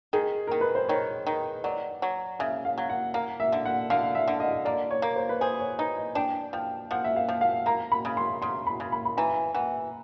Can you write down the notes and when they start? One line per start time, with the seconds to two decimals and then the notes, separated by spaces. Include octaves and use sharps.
0.13 D#3 G#4
0.47 D#3 A#4
0.61 B4
0.75 C5
0.89 D#3 C#5
1.27 D#3
1.64 F#3 D5
2.02 F#3
2.39 C#3 E5
2.65 F5
2.78 F#3
2.89 F#5
3.14 A#3 F5
3.40 E5
3.52 D3
3.65 F#5
3.90 D3 F5
4.15 E5
4.28 D3
4.40 D#5
4.65 A#3 D5
4.91 C#5
5.02 A#3
5.16 C5
5.29 B4
5.41 G#4 C5
5.59 C#5
5.79 D#4 B4
5.97 D#5
6.15 D4 G5
6.53 F3 G5
6.91 F3 F#5
7.04 E5
7.16 F5
7.29 F3
7.41 F5
7.66 A#3 A#5
7.92 B5
8.05 C#3
8.17 C6
8.42 C#3 C6
8.67 B5
8.80 C#3
8.92 B5
9.05 B5
9.17 E3 A#5
9.54 E3 F#5